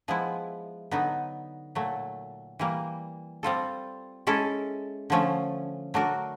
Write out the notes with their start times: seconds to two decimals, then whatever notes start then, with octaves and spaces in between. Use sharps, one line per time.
0.08 F3 G#3 B3 E4
0.91 D3 F#3 B3 D#4
1.75 A#2 F#3 A3
2.59 E3 G3 A#3
3.43 G3 C4 F4 A4
4.27 G#3 C#4 E4 A4
5.10 D3 F3 A3 C#4
5.94 F#3 A3 D4 F#4 A#4